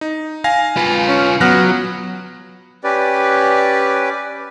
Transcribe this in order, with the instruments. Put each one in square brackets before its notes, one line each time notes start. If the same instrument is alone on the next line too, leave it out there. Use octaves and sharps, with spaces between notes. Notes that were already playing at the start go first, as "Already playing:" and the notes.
[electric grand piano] D#4
F5 G#5 A#6
[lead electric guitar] F4 B4
[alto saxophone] C#4
[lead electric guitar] F#3 [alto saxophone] B3 [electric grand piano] F6 F#6 A#6
[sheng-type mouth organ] C#4 G4 B4 D5